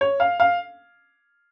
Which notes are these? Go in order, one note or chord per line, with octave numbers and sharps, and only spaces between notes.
C#5
F5
F5